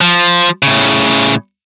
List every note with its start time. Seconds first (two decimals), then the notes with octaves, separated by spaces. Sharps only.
0.01 F3
0.63 A2 C#3